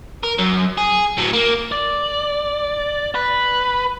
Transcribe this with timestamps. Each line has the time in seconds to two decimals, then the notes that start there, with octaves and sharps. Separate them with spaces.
0.24 A#4
0.39 F#2
0.78 G#4
1.18 A2 F#3
1.33 A#3
1.72 D5
3.15 B4